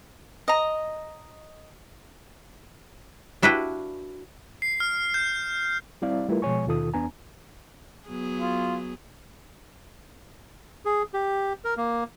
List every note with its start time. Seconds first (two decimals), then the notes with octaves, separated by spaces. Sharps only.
0.48 D#5 A#5
3.42 D4 E4 F#4 B4 F5 G5
4.62 C7
4.80 F6
5.14 G6
6.02 G3 C4 E4 D5 F5
6.28 G3 A3 E4 F4 A#4 B4
6.42 B2 F3 G#3 C#5 G#5 C#6
6.66 D#2 B2 D#3 F4 A4 D#6
6.94 E2 B3 D4 G#5 A#5
8.08 F#3 B3 G#4
8.40 F4
10.85 G#4
11.14 G4
11.64 A#4
11.77 A#3